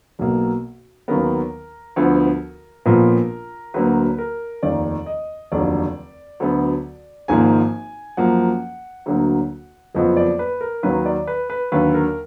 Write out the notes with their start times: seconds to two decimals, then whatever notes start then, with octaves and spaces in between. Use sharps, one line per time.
0.19 B1 B2 A#3
1.08 D#2 D#3 F#3 B3 A#4
1.96 D2 D3 F3 B3
2.85 A#1 A#2 F3 B3 A#4
3.74 D2 D3 F#3 A#3 B4
4.18 A#4
4.63 F1 D#2 D#3 D5
5.06 D#5
5.52 F1 D#2 D3 F#3 D5
6.40 D2 D3 F#3 B3
7.28 G#1 G#2 F3 A#3 G#5
8.17 F#2 F3 A#3 F#5
9.06 D2 D3 F#3 A#3
9.94 F#1 F2 F3 B3 D#5
10.17 D5
10.39 B4
10.61 A#4
10.83 D#2 D#3 F#3 B4
11.06 D5
11.27 B4
11.50 B4
11.72 D#2 D3 F#3 B4
11.94 A#4